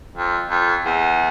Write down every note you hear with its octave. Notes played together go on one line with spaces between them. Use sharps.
F2
F2
E2